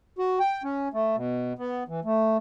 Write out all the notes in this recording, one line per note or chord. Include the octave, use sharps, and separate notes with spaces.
F#4
G5
C#4
A3
B2
B3
E3
A3